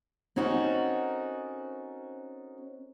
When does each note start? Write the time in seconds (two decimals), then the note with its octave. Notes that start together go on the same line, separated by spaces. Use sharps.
0.36 C4 C#4 D#4 F#4 A4 A#4